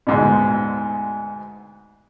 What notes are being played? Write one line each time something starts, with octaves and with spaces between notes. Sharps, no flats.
D2 G#2 B2